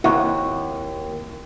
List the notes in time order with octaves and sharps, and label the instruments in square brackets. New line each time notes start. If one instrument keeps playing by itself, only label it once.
[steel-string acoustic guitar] D#2 [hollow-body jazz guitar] A#3 C4 D#5 [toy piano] E4 E5 C#6 [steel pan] F#5